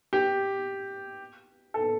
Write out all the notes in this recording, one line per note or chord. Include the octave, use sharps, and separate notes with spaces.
G4
A4